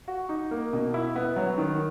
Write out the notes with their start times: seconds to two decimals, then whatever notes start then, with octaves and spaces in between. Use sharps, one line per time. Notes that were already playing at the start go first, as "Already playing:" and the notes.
0.08 F#4
0.29 D#4
0.51 A#3
0.73 B2
0.94 E4
1.16 B3
1.36 F#3
1.58 D#3